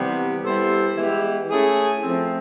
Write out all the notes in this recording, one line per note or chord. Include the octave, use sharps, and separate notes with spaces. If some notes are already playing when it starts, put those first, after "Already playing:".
Already playing: C3 E3 G3 B3
G3 B3 E4 A4 C5
E3 G#3 B3 E4 G4
A3 C#4 E4 G#4
F3 A3 C4